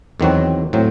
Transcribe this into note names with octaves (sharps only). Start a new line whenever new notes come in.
E2 D#3 F#3 C4 F#4
A2 F#3 C4